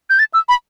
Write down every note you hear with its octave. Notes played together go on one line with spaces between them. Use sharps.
G6
A6
E6
B5